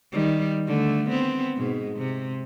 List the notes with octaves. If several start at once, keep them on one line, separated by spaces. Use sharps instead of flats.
D#3 G3
D3 A3
B3 C4
G#2 B2 G#3
C3